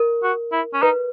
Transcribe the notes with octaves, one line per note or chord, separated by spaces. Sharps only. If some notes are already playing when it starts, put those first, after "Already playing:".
Already playing: A#4
F#4
E4
C#4
D#4 B4